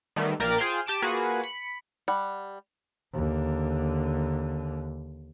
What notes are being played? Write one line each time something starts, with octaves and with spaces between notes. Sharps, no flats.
D#3 G3 A3 B3
A#1 A#3 G4 A#4 D5 A6
F4 G#4 C5 F5 G5
G4 A5 D6 D7 E7
A#3 F4 F#4 G#4 B4
B5 C#7
G3 F#5
D#2 D3